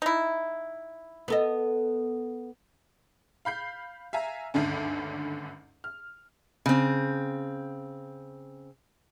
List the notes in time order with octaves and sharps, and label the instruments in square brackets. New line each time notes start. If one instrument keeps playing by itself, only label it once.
[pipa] D#4 E4
[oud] B3 A4 D#5
[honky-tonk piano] F5 B5 G6 C7
E5 F5 G#5 A#5
G#1 D2 G2 D3 C#4
F6
[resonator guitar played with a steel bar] C#3 C4